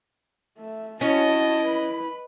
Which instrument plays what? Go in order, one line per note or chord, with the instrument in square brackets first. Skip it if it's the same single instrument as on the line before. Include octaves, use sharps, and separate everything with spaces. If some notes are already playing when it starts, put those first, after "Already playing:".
[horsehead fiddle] A3 E5
[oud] C#4 [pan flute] E4 [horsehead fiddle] F#4 A5 [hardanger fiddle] D#5
[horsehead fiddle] B4 B5